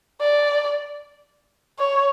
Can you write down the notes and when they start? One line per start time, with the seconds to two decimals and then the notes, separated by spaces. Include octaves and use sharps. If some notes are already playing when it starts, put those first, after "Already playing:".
0.21 D5
1.78 C#5